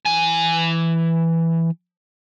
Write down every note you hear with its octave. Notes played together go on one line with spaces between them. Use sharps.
E3 G#5